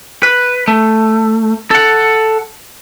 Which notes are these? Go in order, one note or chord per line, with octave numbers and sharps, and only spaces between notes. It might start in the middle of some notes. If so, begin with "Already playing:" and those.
B4
A3
A4 F#5